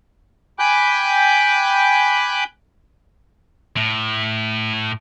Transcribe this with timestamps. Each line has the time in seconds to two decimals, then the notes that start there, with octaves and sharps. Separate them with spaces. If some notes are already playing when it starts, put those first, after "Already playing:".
0.59 G5 G#5 B5 D6 F#6 G6
3.77 A2